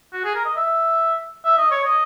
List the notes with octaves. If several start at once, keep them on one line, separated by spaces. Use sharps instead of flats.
F#4
G#4
A#4
D#5
E5
E5
D#5
C#5
D#5